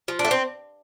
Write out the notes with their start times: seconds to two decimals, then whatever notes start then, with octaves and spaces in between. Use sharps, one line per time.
0.08 F3
0.19 D4
0.25 A3
0.31 C4